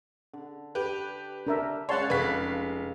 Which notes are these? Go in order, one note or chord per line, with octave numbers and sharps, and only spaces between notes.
D3
G4 B4
D4 A#4 E5
C#3 G#3 C#4 C#5 F#5 A5 C6 C#6
F1 B4 F5 B6